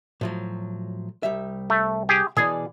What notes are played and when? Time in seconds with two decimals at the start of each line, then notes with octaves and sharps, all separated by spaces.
0.21 A2 F3 F#3
1.23 C2 G3 E5
1.70 A3
2.09 G4 G#4
2.37 B2 E3 G#4 D5